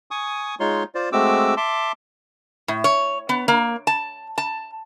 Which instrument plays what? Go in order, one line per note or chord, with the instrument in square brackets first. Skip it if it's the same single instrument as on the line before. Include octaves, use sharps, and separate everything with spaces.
[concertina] G#5 C#6 D#6
G#3 D#4 F4 C#5 C6
F4 C5 D5
G#3 A3 C4 F#4 D6 E6
E5 A5 C6 D6
[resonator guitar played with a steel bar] A2
C#5
B3
A#3
A5
A5